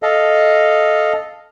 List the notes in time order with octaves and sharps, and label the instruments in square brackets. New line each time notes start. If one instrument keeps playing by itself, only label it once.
[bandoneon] A4 D#5 F5